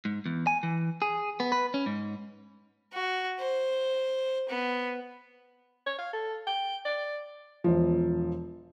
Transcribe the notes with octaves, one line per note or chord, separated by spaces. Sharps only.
G#2
E2
G#5
E3
G#4
B3
B4
C#4
G#2
F#4
C5
B3
C#5
F5
A4
G5
D5
E1 F3